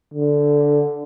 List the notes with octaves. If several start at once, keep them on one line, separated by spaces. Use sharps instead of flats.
D3